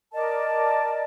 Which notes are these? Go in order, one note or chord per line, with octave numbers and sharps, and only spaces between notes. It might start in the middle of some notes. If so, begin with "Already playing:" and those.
A#4 D5 D#5 A5